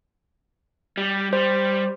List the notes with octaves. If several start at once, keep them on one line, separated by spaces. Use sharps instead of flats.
G3
G3 C5